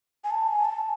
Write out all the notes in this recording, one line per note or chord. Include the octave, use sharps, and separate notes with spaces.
G#5
A5
G#5
A5